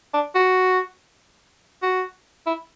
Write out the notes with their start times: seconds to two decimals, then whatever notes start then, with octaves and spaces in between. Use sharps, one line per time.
0.14 D4
0.35 F#4
1.82 F#4
2.46 E4